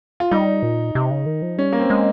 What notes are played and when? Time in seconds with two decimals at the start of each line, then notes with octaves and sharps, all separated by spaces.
0.20 F4
0.31 G3 D#4
0.63 A#2
0.95 C3
1.11 C#3
1.26 D#3
1.42 F3
1.58 G3 C#4
1.73 A#3
1.80 C4
1.90 G#3